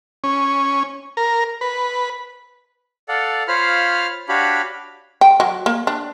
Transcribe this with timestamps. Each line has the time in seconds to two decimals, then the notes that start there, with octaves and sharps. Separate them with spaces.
0.24 C#4
1.17 A#4
1.61 B4
3.09 A4 D5 F5 F#5
3.48 F4 C5 C#5 F5 B5 F6
4.29 D4 F#4 G4 C#5 F5 B5
5.21 G5
5.40 F#3
5.66 A#3
5.87 D4